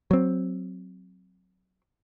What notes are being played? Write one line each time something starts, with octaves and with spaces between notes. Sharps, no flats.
F#3 C4